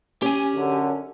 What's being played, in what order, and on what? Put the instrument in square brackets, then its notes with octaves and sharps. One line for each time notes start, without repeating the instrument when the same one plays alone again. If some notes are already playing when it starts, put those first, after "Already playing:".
[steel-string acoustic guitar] C#4 [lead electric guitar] G4 G#5
[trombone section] F#2 D3